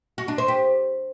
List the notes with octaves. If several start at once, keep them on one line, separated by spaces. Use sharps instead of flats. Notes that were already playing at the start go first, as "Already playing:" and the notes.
F#4
D4
C5
G4